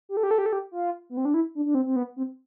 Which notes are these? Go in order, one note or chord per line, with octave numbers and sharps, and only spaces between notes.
G4
A4
G4
A4
G4
A4
G4
F4
B3
C4
D4
E4
D4
D4
C4
C4
B3
C4